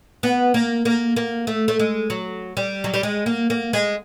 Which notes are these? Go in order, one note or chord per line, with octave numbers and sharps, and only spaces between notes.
B3
A#3
A#3
A#3
A3
A3
G#3
F#3
G3
F#3
G3
G#3
A#3
A#3
G#3